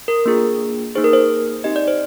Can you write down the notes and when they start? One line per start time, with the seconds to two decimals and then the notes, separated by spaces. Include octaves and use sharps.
0.08 A#4
0.26 A#3 D4 F4 G#4
0.95 A#3 D#4 G#4 C5
1.04 A#4
1.13 C5
1.64 C4 D#4 G4 D#5
1.76 D5
1.88 C5